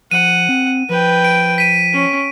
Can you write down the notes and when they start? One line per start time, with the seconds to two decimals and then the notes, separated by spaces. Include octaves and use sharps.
0.11 F3 F#5 D#7
0.49 C4
0.89 F3 B4 G5
1.25 D7
1.58 B6 D#7
1.93 C#4